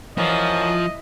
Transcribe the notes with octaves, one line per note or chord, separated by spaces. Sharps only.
F#2 E3 F3 D#5